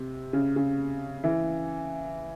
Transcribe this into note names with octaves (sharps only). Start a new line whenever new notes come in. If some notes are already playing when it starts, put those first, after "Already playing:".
Already playing: C3
C#3
C#3
E3